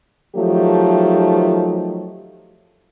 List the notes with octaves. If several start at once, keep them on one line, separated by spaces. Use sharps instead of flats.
D#3 F3 F#3 A3 D#4 G4